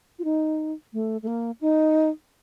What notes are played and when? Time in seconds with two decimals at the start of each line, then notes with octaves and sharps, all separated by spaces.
0.19 F4
0.24 D#4
0.93 A3
1.22 A3
1.27 A#3
1.61 D#4